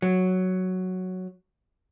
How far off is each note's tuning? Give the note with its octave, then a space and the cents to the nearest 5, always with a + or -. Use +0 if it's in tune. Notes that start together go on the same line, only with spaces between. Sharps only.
F#3 +0